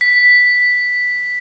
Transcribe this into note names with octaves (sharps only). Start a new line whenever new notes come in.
B6